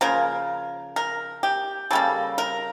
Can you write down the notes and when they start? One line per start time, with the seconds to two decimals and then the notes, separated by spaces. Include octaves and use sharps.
0.01 C#3 F3 A#3 A#4
0.96 A#4
1.43 G4
1.91 C#3 G3 A#3 A4
2.38 A#4